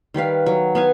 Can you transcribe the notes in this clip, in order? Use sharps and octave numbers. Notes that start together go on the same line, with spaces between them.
D#3 G3 B4 F5
F#3
B3 F5 G#5